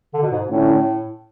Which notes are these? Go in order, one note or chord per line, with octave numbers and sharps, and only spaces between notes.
D3
B2
G#2
A2 D3 A3 C#4 E4